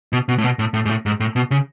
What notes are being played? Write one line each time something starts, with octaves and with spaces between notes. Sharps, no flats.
B2
B2
A2
B2
A2
A2
G#2
A2
G#2
A2
B2
C#3